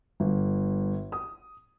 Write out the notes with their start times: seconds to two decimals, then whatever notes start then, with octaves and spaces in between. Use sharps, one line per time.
0.20 G1
1.12 D#6